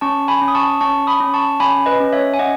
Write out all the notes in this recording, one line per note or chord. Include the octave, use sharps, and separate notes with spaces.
C#4 A5 C#6
G#5 B5
C#4
D#6
A5 C#6
C#4 A5 C#6
B5 D#6
C#4
A5 C#6
C#4 G#5 B5
B4 D#5
C#4
C#5 E5
G#5
C#4 D#5 F#5